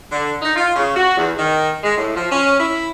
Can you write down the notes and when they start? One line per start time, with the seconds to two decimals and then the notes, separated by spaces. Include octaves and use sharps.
0.11 D3
0.42 D#4
0.55 F4
0.75 C#3
0.96 F#4
1.17 E2
1.36 D#3
1.83 G#3
1.96 A2
2.16 F3
2.31 C#4
2.58 E4